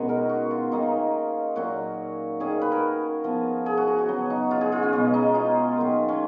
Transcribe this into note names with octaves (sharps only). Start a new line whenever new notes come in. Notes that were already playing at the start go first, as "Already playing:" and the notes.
Already playing: B2 D#3 G#3 B3 C#4 D#4 F#4 G#4
A#4
F#4
F4
D#3 A#3 C#4 D#4
A#2 F#3 A#3 C#4 F#4
D#3 A#3 C#4 G#4
B4
A#4
F3 B3
G#4
F#4
F#4
F#4
C#3 F#3 B3
D#4
F4
G#4
F4
C#4
B2 G#3 B3 C#4
D#4
F4
D#3 F#3 A#3
C#4